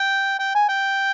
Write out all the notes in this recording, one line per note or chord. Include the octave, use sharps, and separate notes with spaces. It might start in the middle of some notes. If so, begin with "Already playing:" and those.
Already playing: G5
G5
G#5
G5